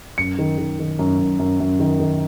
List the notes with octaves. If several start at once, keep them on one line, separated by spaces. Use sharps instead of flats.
F#2 C#7
D#3
D#3
D#3
F#2
F#2
F#2
F#2
D#3
D#3